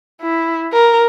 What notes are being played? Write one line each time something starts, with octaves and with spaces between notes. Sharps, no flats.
E4
A#4